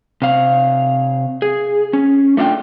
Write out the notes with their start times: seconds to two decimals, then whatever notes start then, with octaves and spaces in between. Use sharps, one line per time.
0.22 C3 F5
1.42 G#4
1.93 C#4
2.37 A3 D4 F4 F5 G5